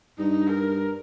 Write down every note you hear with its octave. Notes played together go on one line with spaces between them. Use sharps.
G2 D#4
A#4